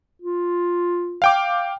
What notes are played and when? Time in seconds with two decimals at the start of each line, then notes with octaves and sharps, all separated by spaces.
0.22 F4
1.22 F5 G5 D6